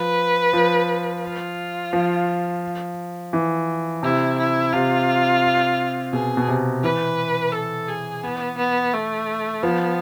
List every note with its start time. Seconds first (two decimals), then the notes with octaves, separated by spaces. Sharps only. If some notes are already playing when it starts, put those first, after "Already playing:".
Already playing: F3 B4
0.53 F3
1.24 F4
1.93 F3
3.33 E3
4.03 C3 E4
4.38 E4
4.73 C3 F4
6.13 B2 G#4
6.37 B2
6.49 C3
6.83 E3 B4
7.53 A4
7.88 G#4
8.23 B3
8.58 B3
8.93 A3
9.63 F3 B3